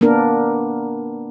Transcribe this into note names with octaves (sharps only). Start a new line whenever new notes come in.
A#3 B3 D4 A#4